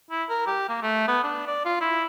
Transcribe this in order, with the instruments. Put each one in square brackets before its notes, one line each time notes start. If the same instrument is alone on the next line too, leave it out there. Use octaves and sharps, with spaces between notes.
[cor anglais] E4
A#4
G4
A#3
A3
B3
D4
D5
F4
E4